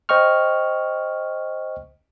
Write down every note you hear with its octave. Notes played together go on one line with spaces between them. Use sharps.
C5 D#5 G5 C#6 F6